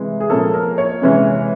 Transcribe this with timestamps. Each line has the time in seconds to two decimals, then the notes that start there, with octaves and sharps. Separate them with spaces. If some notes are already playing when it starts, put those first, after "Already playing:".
Already playing: C3 E3 G#3
0.20 G#4
0.30 A#2 F3 A#3 C#4 A4
0.54 A#4
0.78 C#5
1.02 C3 E3 G#3 C#4